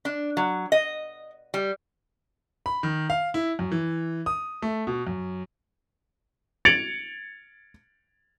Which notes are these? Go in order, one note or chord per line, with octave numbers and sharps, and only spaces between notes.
D4
F#3
D#5
G3
B5
D#3
F5
E4
F#2
E3
D#6
A3
B2
F#2
G#6 A6 C#7 D7 F7 F#7